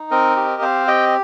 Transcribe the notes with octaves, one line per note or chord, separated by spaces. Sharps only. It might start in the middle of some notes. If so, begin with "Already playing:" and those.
Already playing: D#4
C4 A#4 D#5
G4
C4 C5 F5
G4 D#5 G5